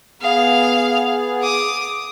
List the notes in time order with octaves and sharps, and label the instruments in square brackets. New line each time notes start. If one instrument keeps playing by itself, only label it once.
[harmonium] B3 G#4 [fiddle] F5
[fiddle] D6 D#6